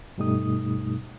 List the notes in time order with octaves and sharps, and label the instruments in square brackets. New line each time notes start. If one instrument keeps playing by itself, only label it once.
[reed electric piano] G2 B2 G3 A3 D#4 D#6